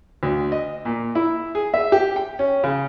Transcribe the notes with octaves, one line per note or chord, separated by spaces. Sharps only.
D2
D#5
A#2
E4
G#4
E5
G4
G5
C#4
C#3